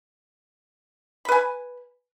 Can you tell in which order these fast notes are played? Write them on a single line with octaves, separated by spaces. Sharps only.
B5 B4 G#5